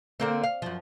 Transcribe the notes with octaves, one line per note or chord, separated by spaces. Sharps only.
D3 A#3 C4
F5
F#2 F3